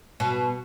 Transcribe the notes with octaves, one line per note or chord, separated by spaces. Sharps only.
B2